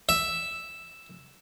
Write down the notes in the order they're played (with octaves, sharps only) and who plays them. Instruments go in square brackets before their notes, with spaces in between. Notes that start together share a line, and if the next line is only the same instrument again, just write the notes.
[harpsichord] E5